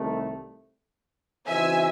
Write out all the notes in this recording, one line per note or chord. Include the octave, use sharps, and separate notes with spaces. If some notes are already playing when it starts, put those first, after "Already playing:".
Already playing: C2 C3 D#3 A3
C#3 E3 C4 D#4 F#4 E5 G#5